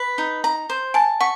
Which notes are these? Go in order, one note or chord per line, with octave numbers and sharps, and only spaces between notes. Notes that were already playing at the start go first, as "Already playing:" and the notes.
Already playing: B4
D#4
A#5
C5
G#5 A5
F#5 C#6